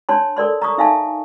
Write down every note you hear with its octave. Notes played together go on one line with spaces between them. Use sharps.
D4 C#5 A5 C6
A4 A#4 D5 C6
A#5 C#6 D#6
D#4 E5 F5 G#5 A5